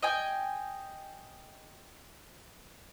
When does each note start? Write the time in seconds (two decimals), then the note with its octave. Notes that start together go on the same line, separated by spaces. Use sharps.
0.03 D#5 G5 G#5